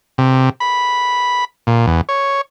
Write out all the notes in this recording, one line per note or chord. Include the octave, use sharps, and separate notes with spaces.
C3
B5
A#2
E2
C#5